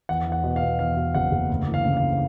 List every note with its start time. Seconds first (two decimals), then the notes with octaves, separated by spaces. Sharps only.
0.09 E2 F#5
0.26 E2
0.32 F#5
0.44 B2
0.56 F5
0.62 B2
0.79 E2 F5
0.97 B2
1.15 F#1 F#5
1.31 F#1
1.49 D2
1.68 E3
1.74 F5
1.85 C#3
1.97 F5
2.02 D2